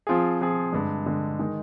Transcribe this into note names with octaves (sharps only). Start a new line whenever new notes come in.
F3 C4 F4 G#4
F3 C4 F4 G#4
G2 D3 G#3
G2 D3 G#3
D#3 G#3 D#4